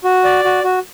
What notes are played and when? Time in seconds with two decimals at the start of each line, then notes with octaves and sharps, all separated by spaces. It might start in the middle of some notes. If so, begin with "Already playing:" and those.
0.04 F#4
0.24 D5
0.44 F#4
0.64 F#4